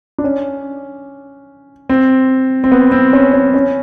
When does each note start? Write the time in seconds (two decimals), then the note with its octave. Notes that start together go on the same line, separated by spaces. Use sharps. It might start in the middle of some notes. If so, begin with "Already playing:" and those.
0.18 D4
0.24 C#4
1.89 C4
2.64 C4
2.72 B3
2.92 C4
3.13 C#4
3.33 C#4
3.54 C#4